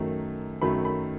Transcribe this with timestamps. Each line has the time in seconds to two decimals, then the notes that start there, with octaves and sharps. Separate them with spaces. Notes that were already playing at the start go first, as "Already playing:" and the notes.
Already playing: F#2 D#3 F#3 A3
0.62 F#2 D#3 F#3 A3 B5
0.85 B5